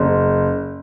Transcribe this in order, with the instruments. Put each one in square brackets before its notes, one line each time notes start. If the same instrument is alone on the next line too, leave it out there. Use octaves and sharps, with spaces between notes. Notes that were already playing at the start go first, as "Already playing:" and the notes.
Already playing: [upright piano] F#1